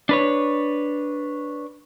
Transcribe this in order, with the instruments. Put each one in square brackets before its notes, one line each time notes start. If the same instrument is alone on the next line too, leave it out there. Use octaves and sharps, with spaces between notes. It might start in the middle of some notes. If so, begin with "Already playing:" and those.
[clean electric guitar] D4 B4 C#5